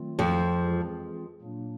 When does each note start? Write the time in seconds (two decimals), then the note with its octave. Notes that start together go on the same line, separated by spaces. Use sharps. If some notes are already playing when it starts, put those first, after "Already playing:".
Already playing: D#3 F#3 A3 C4 F4
0.19 F2 F3
0.60 E3 G#3 C4 F4 G#4
1.41 A#2 F#3 A#3 D4